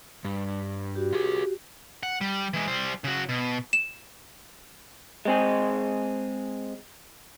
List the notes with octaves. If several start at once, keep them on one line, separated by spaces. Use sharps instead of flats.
G2
F#4 G4
F4 G#4
F#5
G3
E3 G#3
G3 C5
C#3 F#4
B2
E7
G#3 C4 G#4